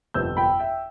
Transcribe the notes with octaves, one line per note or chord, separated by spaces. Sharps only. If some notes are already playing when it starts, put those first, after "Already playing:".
G1 F2 C3 F3 B3 E6 G6
G5 B5
E5 G5